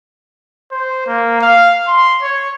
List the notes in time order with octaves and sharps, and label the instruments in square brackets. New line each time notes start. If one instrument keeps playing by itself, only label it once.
[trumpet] C5
A#3
F5
C6
C#5